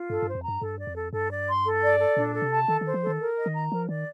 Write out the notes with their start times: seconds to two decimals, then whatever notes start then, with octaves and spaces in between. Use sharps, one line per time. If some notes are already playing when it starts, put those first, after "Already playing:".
Already playing: F4
0.09 G2 A4
0.22 G2 C5
0.35 F2
0.44 G2 A#5
0.61 G2 A4
0.79 D5
0.87 F2
0.95 A4
1.12 G2 A4
1.30 D5
1.47 C6
1.65 A4
1.83 D5
2.00 A4
2.16 A#2 D4
2.34 A4
2.42 C3
2.51 A5
2.68 D#3 A4
2.81 D#3 C5
2.94 F3
3.02 D#3 A4
3.20 A#4
3.38 D#5
3.46 D#3
3.54 A#5
3.72 F3 A#4
3.89 D#3 D5